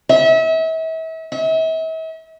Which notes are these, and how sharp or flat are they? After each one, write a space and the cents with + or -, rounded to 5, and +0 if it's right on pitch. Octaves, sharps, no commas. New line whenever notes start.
E5 -35
E5 -40